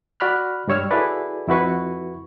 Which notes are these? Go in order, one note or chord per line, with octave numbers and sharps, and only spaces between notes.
F#4 D5 B5 F6 F#6
G2 G3 C#5 E6 F6
E4 F#4 G#4 A4 B4 D5
F2 E4 F#4 B4 C#6